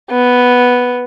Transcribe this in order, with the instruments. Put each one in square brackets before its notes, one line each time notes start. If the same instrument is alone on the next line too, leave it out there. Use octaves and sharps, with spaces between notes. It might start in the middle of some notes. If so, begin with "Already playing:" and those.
[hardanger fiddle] B3